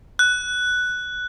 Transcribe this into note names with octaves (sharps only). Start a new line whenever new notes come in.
F#6